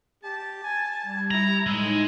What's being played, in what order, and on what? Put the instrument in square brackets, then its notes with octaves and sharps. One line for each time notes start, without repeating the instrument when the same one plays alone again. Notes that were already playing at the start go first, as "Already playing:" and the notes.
[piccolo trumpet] G4 [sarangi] A5
[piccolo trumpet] G#5
[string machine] G3 [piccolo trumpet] G#6
[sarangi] E4 [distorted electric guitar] A#5
[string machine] A2 D#4 [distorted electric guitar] G#3 [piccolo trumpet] E6